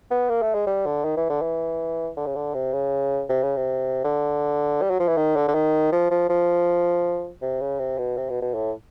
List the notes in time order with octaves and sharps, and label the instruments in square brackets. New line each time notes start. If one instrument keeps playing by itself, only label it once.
[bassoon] B3
A#3
A3
G#3
G3
D3
D#3
E3
D3
E3
D3
C#3
D3
C3
C#3
C3
C#3
C3
D3
G3
F#3
F3
E3
D#3
D3
D3
D#3
F3
F3
F3
C3
C#3
C3
B2
C3
B2
B2
A2